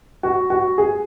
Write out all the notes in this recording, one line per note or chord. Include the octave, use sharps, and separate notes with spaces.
F#4
F#4
G#4